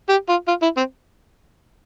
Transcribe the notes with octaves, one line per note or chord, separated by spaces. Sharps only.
G4
F4
F4
E4
C4